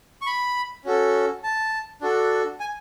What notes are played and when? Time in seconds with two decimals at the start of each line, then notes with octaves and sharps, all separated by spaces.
0.22 C#6
0.27 B5
0.85 C#4 F#4 A4
1.44 A5
2.01 D4 F#4 A4
2.60 G#5